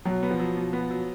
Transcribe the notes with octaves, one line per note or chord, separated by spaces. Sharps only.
B2 F#3
B3
F3
F#3
B2
B3
F#3